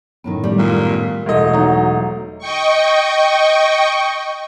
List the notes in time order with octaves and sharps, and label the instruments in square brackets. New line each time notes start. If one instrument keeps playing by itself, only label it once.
[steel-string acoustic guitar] F#2 A2 D#3 [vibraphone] B3
[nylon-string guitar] G3
[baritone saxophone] A#2
[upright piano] E1 A3 D#5
[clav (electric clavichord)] F#3 D#4
[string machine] D#5 G5 C#6